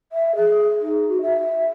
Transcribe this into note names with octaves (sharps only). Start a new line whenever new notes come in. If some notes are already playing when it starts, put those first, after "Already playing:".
E5
G#4
D#4
F#4
E5